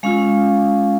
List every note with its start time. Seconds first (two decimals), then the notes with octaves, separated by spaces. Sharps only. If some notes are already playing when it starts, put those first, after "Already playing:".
0.03 G#3 C#4 F4 F5